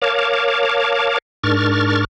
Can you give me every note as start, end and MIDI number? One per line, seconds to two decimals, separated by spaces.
0.02 1.18 70
0.02 1.18 73
0.02 1.18 77
0.02 1.18 81
0.02 1.18 86
1.44 2.04 44
1.44 2.04 62
1.44 2.04 70
1.44 2.04 85
1.44 2.04 89
1.44 2.04 93